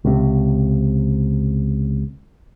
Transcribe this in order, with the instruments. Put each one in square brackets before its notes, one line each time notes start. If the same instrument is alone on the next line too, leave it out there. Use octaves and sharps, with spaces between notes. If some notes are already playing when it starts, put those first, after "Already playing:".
[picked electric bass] C#2 C3